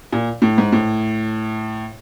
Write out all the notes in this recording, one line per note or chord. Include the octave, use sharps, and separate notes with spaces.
A#2
A2
G#2
A2